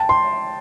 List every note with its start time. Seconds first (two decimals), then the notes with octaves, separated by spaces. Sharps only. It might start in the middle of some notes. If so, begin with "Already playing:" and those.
Already playing: G5 A5
0.09 C6